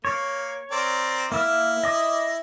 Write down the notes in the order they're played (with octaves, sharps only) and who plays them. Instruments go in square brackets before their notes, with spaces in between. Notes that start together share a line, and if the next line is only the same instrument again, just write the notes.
[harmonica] A#3 [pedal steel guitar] C#5
[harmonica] C4 A#4 D5
[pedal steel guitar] A#3 E5 F6 [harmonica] E4
[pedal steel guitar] D#5 D6 D#6